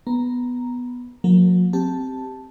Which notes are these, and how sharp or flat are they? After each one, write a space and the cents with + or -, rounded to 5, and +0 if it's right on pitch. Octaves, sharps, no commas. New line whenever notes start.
B3 +0 A#5 +0
F#3 -40 A#3 -35 A#4 +0
C4 +0 G4 +0 A5 +0